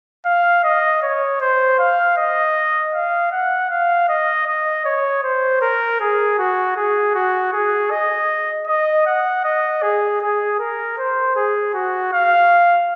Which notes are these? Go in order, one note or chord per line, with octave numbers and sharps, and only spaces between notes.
F5
D#5
C#5
C5
F5
D#5
F5
F#5
F5
D#5
D#5
C#5
C5
A#4
G#4
F#4
G#4
F#4
G#4
D#5
D#5
F#5
D#5
G#4
G#4
A#4
C5
G#4
F#4
F5